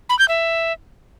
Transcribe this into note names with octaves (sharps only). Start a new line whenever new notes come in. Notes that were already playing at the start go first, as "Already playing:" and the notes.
B5
G6
E5